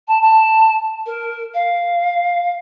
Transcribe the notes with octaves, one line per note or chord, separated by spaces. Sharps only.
A5
A5
A#4
F5